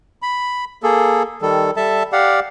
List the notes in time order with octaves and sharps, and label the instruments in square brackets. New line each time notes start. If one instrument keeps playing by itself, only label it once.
[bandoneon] B5
A#3 G#4 A4
D#3 G3 A4
G3 A4 E5 A5
G4 D5 F5 F#5